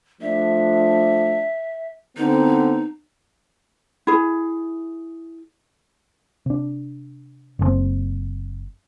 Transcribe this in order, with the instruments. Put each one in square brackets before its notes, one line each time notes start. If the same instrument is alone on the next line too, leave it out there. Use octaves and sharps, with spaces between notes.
[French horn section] F3 A3 D4 [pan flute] E5
[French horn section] D3 B3 C4 [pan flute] D#4
[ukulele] E4 G#4
[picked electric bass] C3 D4
F#1 B2 C4